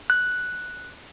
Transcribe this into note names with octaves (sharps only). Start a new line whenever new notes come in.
F#6